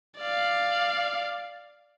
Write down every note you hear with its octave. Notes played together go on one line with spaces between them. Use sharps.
D5 F5